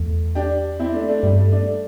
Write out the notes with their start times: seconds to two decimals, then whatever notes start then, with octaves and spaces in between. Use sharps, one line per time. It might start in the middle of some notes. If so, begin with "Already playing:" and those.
Already playing: E2 A3
0.35 D4 G4
0.79 C4 E4
0.93 A3 D4
1.08 A3 D4
1.23 G2 G3
1.38 A3
1.52 A3 D4